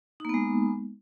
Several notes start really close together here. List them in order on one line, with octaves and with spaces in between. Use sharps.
D#4 A#3 B3 G#3